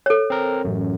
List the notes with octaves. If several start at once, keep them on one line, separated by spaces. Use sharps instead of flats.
A4 C#5
C4 A#4
A1 F#2